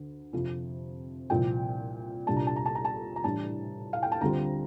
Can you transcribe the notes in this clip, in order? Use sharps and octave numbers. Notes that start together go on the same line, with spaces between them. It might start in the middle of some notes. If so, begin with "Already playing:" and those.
Already playing: D2 D3
F2 C3 F3
C2 A#2 F3 G5
C2 A#2 G3 D4 A5
A#5
A5
A#5
A5
A#5
A5
A#5
A2 E3 G3 D4 A5
F5
G5
A5
D2 D3 G3 C4 F4 A#5